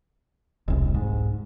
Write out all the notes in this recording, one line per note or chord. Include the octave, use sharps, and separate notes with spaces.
E1 C2
G#2